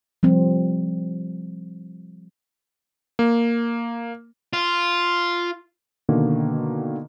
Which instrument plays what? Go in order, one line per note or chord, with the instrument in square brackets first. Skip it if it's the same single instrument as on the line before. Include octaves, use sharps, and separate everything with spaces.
[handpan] F3 G3 C4
[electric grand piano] A#3
[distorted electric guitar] F4
[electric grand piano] B2 D3 D#3 A#3